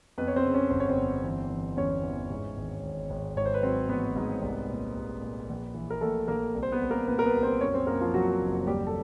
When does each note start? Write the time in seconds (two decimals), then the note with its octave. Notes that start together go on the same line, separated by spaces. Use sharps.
0.18 F2 B3 B4
0.28 C#5
0.36 C4 C5
0.45 C#3
0.54 C#4 C#5
0.71 G1 C5
0.80 C#5
0.89 C4 C5
0.98 G1
1.24 E3
1.50 E3
1.77 E2 C#4 C#5
2.03 E3
2.30 G#2
2.57 G#1
2.83 G#1
3.10 G#1
3.37 G#2 C#5
3.46 C5
3.54 B4
3.62 F#3 C4 C5
3.89 A1 B3 B4
4.16 G#2
4.42 C2
4.70 A#2
4.95 C2
5.22 A#2
5.49 A#1
5.75 E3
5.90 A#4
6.01 A#1 A3 A4
6.28 A#1 A#3 A#4
6.54 C2
6.63 C5
6.72 B3 B4
6.81 C2
6.91 A#3 A#4
7.07 A#2 B3 B4
7.19 A#4
7.26 B3 B4
7.34 C2
7.43 C4 C5
7.61 F#2 C#4 C#5
7.74 C4 C5
7.87 F#2 A#3 A#4
8.01 F3 F4
8.14 F3 F#3 F#4
8.41 F#1
8.67 D#2 G3 G4
8.87 A4